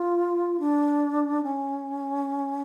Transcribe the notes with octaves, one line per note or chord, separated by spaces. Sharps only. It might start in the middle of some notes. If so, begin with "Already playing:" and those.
Already playing: F4
D4
C#4